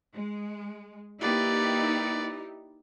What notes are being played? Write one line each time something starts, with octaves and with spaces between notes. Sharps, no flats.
G#3
A#3 D#4 E4 G4 B4 D5